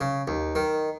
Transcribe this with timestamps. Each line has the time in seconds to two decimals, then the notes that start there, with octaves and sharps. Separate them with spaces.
0.01 C#3
0.28 D#2
0.55 D#3